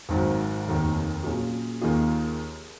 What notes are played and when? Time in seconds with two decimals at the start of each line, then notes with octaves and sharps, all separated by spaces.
0.09 G#1 G#2 D#3 F#3
0.67 F1 D#2 D#3
1.23 A#2 F#3 C#4 F4 G#4
1.81 D#2 D#3 A#3 F4 G#4